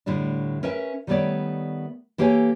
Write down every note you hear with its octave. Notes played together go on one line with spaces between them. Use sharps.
A2 D3 G3 D4
C#4 A#4 B4 E5
D#3 G3 A3 B3 C#5 D5
E3 A#3 G4 A4 C#5 G#5